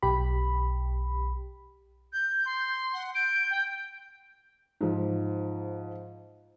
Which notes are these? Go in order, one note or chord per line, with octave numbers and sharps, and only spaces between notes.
B1 G4 B5
G6
C6
F#5
G6 D7
G5
G#2 F3